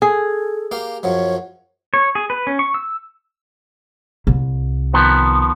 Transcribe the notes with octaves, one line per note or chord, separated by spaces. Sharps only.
G#4 A4
A#3 G4 F5
F#2 F3 F#3 C#5
C#5
G#4
B4
C#4
C#6
E6
C2
D#3 F3 B3